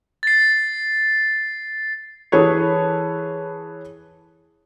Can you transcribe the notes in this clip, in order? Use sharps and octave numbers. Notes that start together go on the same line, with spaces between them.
A6 C7
E3 G#4 A4 B4 C#5